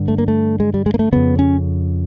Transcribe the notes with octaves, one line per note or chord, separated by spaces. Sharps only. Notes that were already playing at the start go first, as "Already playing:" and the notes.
Already playing: G2 D3
A3
A#3
A3
G#3
G3
G#3
A#3
A3
F2 C#3 B3
C#4